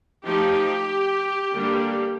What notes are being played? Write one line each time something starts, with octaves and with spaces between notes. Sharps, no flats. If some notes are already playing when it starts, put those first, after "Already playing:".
F3 A3 D#4 G4
D3 G3 A#3 D4